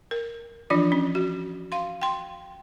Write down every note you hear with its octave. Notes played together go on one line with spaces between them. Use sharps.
A#4
E3 F3 D4 F4 D5
C#4
F#4
F5 C6
G5 C6